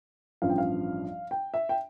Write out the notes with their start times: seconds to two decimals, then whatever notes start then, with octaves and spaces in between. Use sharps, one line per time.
0.42 A1 G2 F3 F5
0.50 G5
0.58 F5
1.31 G5
1.54 E5
1.69 G5